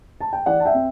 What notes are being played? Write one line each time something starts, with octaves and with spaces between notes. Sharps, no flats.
A5
G5
E3 D5 F#5
A5
E5 G5
C4